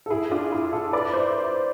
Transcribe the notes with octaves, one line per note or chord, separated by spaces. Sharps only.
A4
E4 G#4
D4 F4
E4 G#4
F4 A4
B4 D5
C5 E5